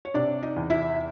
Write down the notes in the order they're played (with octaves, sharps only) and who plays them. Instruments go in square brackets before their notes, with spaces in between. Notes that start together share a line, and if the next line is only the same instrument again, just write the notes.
[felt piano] C#5
C3 D4 D5
D#4 D#5
E2
E4 E5